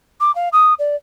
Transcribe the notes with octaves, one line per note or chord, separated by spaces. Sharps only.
D6
F5
D#6
D5